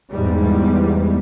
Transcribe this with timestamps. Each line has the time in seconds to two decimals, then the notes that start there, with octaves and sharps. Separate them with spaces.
0.10 E2 G#2 G3